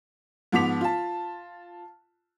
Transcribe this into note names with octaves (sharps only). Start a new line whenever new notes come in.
G#2 F3 B3 D6 B6 F7
F4 A5